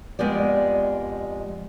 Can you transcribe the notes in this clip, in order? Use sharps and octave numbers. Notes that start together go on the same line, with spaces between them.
F2 G#3 B3 G4 D5